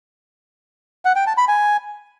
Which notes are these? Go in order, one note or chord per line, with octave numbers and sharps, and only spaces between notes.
F#5
G5
A5
B5
G#5